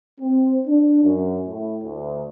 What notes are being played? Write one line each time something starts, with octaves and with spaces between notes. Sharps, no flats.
C4
D4
F#2
A2
D2